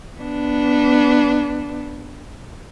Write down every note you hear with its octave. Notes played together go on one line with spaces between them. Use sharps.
B3 D4